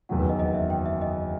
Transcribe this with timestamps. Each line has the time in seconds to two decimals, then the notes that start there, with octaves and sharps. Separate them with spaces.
0.09 F#1 E2 D#3 F#3 F#5
0.19 B4
0.29 D#5
0.39 D#5
0.55 E5
0.70 G5
0.86 E5
1.02 D#5